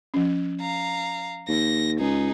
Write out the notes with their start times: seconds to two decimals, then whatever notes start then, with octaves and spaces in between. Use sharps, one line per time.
0.14 F3 C#4
0.61 F5 A#5
1.48 D#2 A#6
2.00 C#2 D#4 G#4